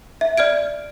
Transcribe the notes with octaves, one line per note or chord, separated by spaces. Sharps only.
E5
D5 F6 G#6 D7